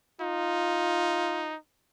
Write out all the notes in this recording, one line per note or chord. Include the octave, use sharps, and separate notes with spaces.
D#4 F4